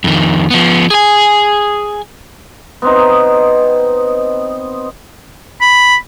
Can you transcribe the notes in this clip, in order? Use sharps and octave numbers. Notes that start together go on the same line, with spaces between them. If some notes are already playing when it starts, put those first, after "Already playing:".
F2 D#3
F3 B3
G#4 G#5
B3 C4 D#4
B5